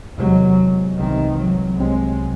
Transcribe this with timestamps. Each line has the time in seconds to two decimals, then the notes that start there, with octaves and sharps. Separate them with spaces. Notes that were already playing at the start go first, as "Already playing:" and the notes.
0.18 E2 C3 D#3 F#3 G#3
0.98 C2 C3 D#3 E3 G#3 C4
1.39 F#3
1.79 C2 C3 F#3 G#3 C4